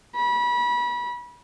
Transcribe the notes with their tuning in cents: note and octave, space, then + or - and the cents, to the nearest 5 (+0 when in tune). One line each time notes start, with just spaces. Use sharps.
B5 -30